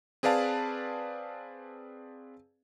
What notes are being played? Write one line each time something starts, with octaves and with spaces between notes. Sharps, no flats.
C4 G#4 B4 D5 F5 A5